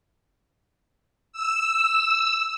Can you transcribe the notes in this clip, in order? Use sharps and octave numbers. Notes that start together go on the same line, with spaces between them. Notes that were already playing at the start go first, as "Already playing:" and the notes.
E6